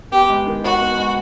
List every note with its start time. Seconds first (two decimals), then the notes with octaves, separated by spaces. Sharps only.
0.12 B3 G4
0.29 G#3
0.47 D#3
0.64 D#4 F#4
0.80 B3
0.98 G#3